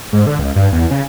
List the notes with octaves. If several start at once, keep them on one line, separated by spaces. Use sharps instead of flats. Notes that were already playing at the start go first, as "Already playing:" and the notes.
G#2
D3
C#2
G2
E2
C#3